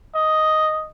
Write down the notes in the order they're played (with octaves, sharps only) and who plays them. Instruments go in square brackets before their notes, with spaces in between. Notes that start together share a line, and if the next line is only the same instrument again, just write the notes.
[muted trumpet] D#5